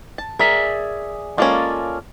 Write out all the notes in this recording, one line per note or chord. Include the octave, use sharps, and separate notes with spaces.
A5
G#4 A#4 D5 E5
G#3 A#3 C#4 F4 A4 D5